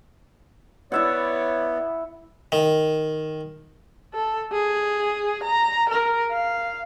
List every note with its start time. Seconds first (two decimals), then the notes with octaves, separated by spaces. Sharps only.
0.92 B3 E4 C#5 D5 E5 F#5
2.52 D#3
4.14 A4
4.52 G#4
5.44 A#5
5.90 A#4
6.32 F5